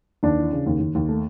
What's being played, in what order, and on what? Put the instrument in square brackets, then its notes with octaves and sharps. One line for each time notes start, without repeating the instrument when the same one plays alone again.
[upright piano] D#2 D4
E3
C#3
D#2
D#2
D#2
A3